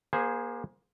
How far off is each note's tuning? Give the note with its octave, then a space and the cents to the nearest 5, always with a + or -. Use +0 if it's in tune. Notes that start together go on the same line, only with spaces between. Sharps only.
A#3 +30 G#4 -10 C5 +0